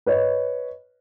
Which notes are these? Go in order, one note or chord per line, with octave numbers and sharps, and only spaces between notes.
B4 C#5 D#5